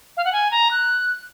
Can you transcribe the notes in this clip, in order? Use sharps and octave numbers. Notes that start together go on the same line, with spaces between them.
F5
F#5
G#5
A#5
F#6